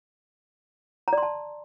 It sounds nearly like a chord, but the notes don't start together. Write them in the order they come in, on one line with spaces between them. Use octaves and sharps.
A#5 D5 C6 A5